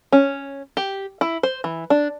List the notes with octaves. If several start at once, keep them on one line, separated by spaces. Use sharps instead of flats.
C#4
G4
E4
C5
E3
D4